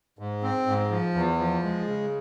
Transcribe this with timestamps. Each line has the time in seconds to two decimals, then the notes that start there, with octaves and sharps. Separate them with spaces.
0.19 G#2
0.43 C4
0.67 G#2
0.91 F3
1.14 E2
1.39 F3
1.63 G#3
1.87 C#3